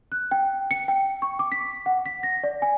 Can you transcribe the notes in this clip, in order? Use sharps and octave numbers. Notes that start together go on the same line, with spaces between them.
F#6
G5
C#7
G5
C#6
D6
B6
F#5
B6
A#6
D5
G#5